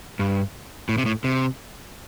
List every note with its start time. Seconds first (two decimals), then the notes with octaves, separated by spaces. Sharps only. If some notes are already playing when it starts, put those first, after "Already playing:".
0.19 G2
0.89 A2
0.98 C3
1.06 A2
1.24 C3